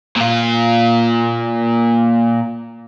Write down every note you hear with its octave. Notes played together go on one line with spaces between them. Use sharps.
A#2 F4